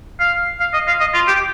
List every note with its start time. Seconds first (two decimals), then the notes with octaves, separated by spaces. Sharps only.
0.20 F5
0.60 F5
0.73 D#5
0.88 F5
1.00 D#5
1.14 F4
1.28 G4